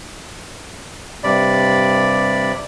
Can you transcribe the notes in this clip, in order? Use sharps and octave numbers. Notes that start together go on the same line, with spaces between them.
G2 C3 D5 B5